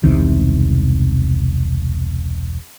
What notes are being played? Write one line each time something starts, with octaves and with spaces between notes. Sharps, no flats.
E1 C2 C3 D#3